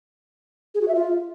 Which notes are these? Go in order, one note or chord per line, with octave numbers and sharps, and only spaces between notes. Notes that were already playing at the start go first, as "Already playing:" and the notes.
G#4
F#4
E5
F4